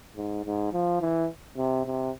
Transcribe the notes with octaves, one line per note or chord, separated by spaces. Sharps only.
G#2
G#2
F3
E3
C3
C3